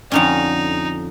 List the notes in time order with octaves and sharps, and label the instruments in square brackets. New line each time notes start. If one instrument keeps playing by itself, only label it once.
[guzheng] F2 D3 C#4 [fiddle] D#4